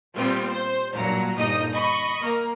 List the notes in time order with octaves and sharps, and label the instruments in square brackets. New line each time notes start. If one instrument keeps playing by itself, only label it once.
[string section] A#2 G3 B3 C4 F4
C5
G2 A#2 F#3 A#5
G1 A#2 G3 D#4 D#5 D#6
D#5 B5 C#6 D#6
A#3 A#5